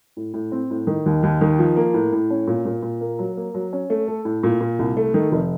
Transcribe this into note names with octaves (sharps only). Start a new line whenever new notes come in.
A2
A2
C4
A2
D#3
D#2
D#2
D#3
F3
A#3
A2
A2
C#4
A#2
A#2
A#2
A#3
F#3
A#3
F#3
C#4
A3
A4
A2
A#2
A#2
C2
A3
D#3
F1